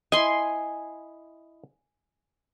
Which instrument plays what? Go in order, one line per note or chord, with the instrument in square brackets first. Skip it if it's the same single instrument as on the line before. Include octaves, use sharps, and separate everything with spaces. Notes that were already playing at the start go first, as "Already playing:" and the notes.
[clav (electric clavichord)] E4 D#5 [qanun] G#5 C6